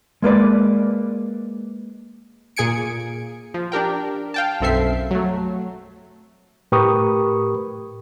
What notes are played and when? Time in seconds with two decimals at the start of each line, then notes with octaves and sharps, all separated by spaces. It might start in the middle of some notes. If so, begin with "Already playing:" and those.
0.22 G#3 A#3 B4 D5
2.57 A#2 G#4 G#5 G#6 C#7 D7
3.54 F3
3.72 D4 G4 A#4 G5
4.34 F5 G5 A5
4.60 B1 F#2 C4 A4 E5 C7
5.11 F#3 A3
6.72 A2 G4 A#4 B4 C#6 D#6